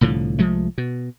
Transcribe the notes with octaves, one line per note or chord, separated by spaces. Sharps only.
C2 A2 D3 F3
C2 F3 G#3 A3
B2